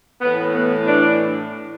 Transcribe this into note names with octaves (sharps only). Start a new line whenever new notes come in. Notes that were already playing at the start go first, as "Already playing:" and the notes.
A2 E3 B3
B3
D4